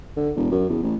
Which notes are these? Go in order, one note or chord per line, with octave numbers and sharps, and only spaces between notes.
D3
E1
F#2
E2
A1